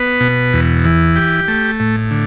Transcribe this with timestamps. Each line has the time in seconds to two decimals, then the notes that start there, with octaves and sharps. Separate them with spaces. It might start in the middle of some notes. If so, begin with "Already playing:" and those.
Already playing: B3 B4
0.20 B2
0.53 E2
0.85 E3
1.16 G4
1.48 A3
1.80 A2
2.11 D3